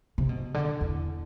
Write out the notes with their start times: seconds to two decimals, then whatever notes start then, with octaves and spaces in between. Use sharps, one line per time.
0.18 C3
0.29 B2
0.54 D3
0.81 E2